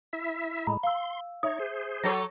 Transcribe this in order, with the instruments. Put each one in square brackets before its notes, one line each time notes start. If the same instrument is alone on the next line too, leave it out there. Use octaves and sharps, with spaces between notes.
[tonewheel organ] E4 E5
[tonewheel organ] A2 G#3 [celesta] A#5 B5
[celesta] F5 E6 [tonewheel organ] C6
[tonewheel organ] D#4 C#5 [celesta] E5 D#6
[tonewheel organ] G#4 C5
[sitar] F#3 A4 C#5 [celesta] A#6